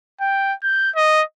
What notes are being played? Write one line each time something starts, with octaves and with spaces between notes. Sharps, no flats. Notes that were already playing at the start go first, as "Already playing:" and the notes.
G5
G6
D#5